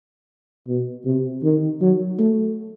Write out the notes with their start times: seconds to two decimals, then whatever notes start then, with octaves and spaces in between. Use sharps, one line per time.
0.68 B2
1.05 C3
1.43 D#3
1.81 F#3
2.19 A3